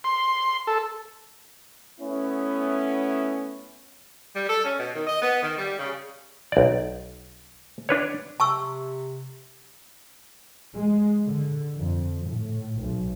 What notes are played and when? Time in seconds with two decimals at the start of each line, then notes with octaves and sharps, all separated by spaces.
0.04 C6
0.67 A4
2.00 A3 B3 C#4 E4
4.35 G3
4.48 A4
4.64 C#4
4.79 B2
4.95 D#3
5.07 D#5
5.22 B3
5.43 D#3
5.58 G3
5.78 C#3
6.52 B1 D5
7.89 D4 B4 C#5
8.40 C3 A5 C#6 E6
10.75 G#3
11.24 D3
11.78 F2
12.27 A2
12.80 B1